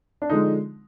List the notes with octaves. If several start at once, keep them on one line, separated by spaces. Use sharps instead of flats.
D4
D3 F3 G#3 D#4